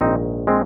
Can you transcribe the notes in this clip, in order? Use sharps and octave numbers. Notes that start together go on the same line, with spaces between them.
A#1 G#2 D#3 C4 D#4
G#3 C4